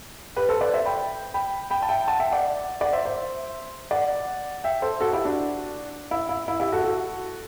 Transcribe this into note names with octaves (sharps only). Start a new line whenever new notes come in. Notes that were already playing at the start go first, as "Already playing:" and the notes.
G4 B4
A4 C5
B4 D5
C5 E5
G5 B5
G5 B5
G5 B5
A5
E5 G5
F#5 A5
E5 G5
D5 F#5
D5 F#5
C5 E5
C5 E5
D5 F#5
E5 G5
A4 C5
F#4 A4
E4 G4
D4 F#4
E4
E4
E4
E4 G4
F#4 A4
F#4 A4